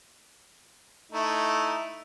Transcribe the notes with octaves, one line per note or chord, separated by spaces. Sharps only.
A3 D#4 E4